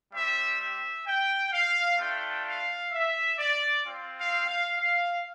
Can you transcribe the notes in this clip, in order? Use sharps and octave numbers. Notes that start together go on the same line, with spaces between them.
G3 C4 G4 E5
E5
G5
F5
A3 D4 F4 G5
F5
E5
D5
C4 F4
F5
F5
F5